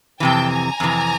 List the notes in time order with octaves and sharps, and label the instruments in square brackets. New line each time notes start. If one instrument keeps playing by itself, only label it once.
[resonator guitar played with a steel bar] F2 C3 E3 [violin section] G5 A5
[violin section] G#5 A#5
[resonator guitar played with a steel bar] F2 C3 E3